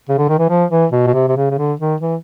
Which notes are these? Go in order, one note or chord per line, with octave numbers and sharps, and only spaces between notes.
C#3
D3
D#3
E3
F3
E3
B2
B2
C3
C3
C#3
C#3
D3
D#3
E3